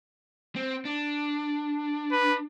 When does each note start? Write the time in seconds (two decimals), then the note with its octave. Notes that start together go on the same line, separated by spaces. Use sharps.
0.56 C4
0.85 D4
2.12 B4